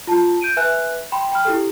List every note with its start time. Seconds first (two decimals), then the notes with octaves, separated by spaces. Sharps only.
0.07 F4 A5
0.41 G6 D7 D#7
0.57 B4 E5 G#5 F#6
1.12 G5 B5 C6
1.32 G5 B5 F6
1.45 E4 G4 A4